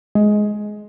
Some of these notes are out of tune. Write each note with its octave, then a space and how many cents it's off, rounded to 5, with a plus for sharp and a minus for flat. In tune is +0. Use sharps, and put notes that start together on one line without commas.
G#3 +15